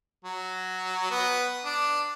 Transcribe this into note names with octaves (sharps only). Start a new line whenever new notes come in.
F#3
B3
D4